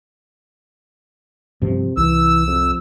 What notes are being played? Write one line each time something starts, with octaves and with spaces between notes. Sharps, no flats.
G2 C3 F3
C2 E3 E6
F2